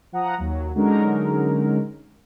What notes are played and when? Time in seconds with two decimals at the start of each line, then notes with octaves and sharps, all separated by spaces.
0.12 F3 F#5 A#5 D#6
0.38 D#2 F#3
0.74 D3 F#3 G#3 C#4 D#4 A#4